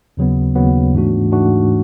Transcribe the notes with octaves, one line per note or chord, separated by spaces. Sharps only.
D#2 C#3 F#3 B3
D#2 C#3 F#3 B3
G#2 E3 A3 D4 F#4
G#2 E3 A3 D4 F#4